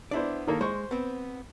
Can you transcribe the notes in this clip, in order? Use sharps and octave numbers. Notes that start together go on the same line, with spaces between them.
B3 D4 E4 C5 D5
D#3 A#3 A4
G#3 C5 C#6
B3 C4